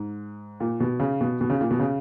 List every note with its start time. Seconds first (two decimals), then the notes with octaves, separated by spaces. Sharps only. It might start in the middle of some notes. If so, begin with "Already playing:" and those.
Already playing: G#2
0.60 A#2
0.80 B2
1.00 C#3
1.21 B2
1.41 B2
1.50 C#3
1.61 A#2
1.71 B2
1.79 C#3